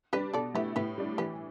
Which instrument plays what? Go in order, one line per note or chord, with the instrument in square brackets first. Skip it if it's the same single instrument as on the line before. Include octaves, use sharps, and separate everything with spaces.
[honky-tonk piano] G3 D4 [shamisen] G4 B4
[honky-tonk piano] B2 [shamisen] A4 D5
[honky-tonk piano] A3 E4 [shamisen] G4 B4
[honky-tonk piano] A2 [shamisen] G4 B4
[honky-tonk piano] G3 D4
[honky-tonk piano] E3 [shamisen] G4 B4